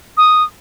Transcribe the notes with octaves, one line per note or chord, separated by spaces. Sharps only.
D#6